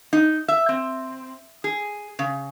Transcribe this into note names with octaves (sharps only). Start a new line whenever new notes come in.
D#4
E5
C4
G#4
C#3